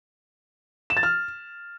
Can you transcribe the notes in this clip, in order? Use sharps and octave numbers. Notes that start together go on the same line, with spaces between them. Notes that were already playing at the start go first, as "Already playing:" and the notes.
E7
A6
F6